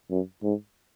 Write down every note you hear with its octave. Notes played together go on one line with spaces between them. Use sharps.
F#2
G#2